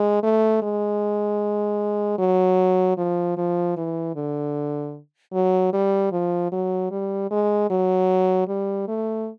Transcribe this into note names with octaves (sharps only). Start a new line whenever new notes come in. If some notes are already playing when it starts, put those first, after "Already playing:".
Already playing: G#3
A3
G#3
F#3
F3
F3
E3
D3
F#3
G3
F3
F#3
G3
G#3
F#3
G3
A3